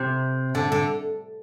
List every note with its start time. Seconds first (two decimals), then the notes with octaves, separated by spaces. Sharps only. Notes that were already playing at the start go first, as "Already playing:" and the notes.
Already playing: C3
0.55 D3
0.72 D3